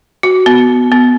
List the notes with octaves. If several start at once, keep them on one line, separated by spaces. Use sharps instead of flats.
F#4
B3
B3